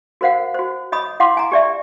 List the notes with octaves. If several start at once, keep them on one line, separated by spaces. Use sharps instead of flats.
F#4 A#4 C5 F5 F#5
F#4 C5
C#5 D#5 B5 D#6
E4 F5 F#5 C6 D6
G#5 A#5
G4 D5 E5